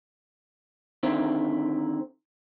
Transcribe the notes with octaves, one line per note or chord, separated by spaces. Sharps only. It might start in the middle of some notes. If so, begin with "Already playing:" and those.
D3 D#3 C4 E4